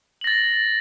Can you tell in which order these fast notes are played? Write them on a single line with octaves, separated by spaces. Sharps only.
F#7 A#6 A6